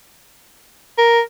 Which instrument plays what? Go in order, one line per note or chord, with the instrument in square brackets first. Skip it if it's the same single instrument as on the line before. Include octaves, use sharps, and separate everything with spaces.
[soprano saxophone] A#4